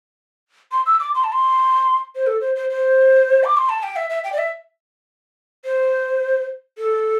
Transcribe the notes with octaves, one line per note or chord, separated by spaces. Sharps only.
C6
E6
D6
C6
A5
C6
C5
A4
C5
C5
C5
D6
C6
A5
G5
E5
E5
G5
D5
E5
C5
A4